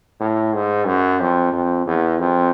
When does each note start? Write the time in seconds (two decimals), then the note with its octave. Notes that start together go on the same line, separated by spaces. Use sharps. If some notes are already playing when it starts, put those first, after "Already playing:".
0.20 A2
0.53 G#2
0.86 F#2
1.20 F2
1.53 F2
1.86 E2
2.19 F2